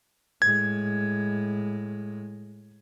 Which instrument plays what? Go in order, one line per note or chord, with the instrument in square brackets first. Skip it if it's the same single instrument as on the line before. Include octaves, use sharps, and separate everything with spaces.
[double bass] A2 G#3 [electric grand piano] G#6